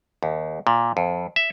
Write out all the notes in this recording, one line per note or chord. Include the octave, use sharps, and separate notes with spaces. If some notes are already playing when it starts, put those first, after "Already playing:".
D#2
A#2
F2
E5